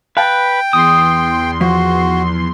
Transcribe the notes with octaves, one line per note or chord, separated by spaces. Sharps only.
B4 F5 G5 A5
E2 C6 D#6
F3 F#4